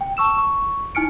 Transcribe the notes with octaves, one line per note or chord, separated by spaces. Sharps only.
G5
A5 C#6 E6 E7
C#6
D#4 E4 G#5 F6 C#7 D7